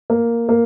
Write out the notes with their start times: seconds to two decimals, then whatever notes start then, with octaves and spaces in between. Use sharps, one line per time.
0.10 A#3
0.49 A#3